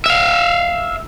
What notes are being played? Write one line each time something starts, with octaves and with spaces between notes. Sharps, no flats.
E5 F5